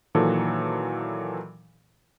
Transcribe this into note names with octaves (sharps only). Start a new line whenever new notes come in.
A#2 D#3 E3 F#3 A4